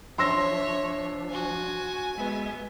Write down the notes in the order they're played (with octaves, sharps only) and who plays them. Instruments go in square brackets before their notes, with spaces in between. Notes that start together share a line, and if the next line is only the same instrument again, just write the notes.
[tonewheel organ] F3 D4 [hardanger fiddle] C#5 E5 [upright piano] C6 E6 A#6
[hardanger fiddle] F#4 [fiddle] G#5
[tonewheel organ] G#3 E5 [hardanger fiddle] B3